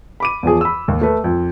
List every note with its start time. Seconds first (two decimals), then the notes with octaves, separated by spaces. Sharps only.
0.20 B5 D6 D#7
0.43 E2 F3 G#4
0.61 B5 E6
0.88 D#2
1.01 A3 B4
1.24 F2